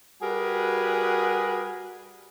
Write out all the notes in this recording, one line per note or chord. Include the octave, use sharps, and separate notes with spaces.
G3 F#4 G#4 A#4 B4 G#5